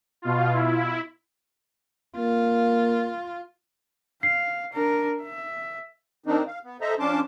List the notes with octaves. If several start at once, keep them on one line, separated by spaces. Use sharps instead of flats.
B2 F4
E4
A#3 F4
F5 C7
D4 A#4
E5
D#3 C4 D4 D#4
F5
B3
A4 C5 D#5 E5 A#5
F3 C#4 D4 A5 C6 D6